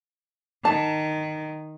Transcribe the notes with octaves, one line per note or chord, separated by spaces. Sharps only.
D#3 A5